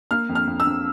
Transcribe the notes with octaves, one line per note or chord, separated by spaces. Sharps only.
A#3 F6
F2
F6
F2
E6
F2